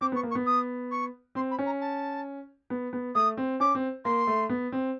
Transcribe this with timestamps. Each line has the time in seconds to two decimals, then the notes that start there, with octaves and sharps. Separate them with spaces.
0.01 C4 D6
0.12 B3
0.16 C#6
0.23 A#3
0.31 C#6
0.35 B3
0.46 D#6
0.91 C#6
1.35 C4 C6
1.51 B5
1.59 C#4
1.66 A#5
1.81 A5
2.70 B3
2.93 B3
3.15 A3 D#6
3.37 C4
3.60 C#4 D6
3.75 C4
4.05 A#3 C6
4.27 A3
4.49 B3
4.72 C4